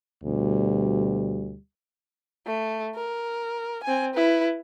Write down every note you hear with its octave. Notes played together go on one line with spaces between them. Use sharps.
D2 B2 G3
A3
A#4
C4 G#5
E4 B4